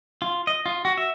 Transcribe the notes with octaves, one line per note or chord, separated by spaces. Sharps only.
F4
D#5
F4
F#4
E5